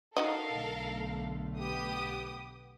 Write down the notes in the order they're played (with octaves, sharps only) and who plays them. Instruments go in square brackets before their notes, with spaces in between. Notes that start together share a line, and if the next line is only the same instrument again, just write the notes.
[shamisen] D#4 F#4 D#5 [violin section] A4 A#4 F5
[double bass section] B1 D3 A3
[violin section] B3 G4 D#6